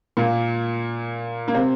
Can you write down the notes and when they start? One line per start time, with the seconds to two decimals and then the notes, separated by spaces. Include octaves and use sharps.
0.17 A#2 A#3
1.48 A#3
1.54 C3 C4